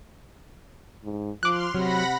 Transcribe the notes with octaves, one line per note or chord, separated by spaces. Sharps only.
G#2
F3 C6 D6 F6 F#6
C3 F#3 F#5 B5 A#6